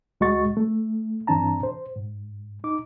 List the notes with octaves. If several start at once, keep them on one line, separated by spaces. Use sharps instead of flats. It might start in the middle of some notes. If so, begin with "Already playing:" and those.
D2 G#3 F#4 D#5 C#6 A6
A3
G2 E3 C4 D4 A5 A#5
C5
G#2
D#4 D6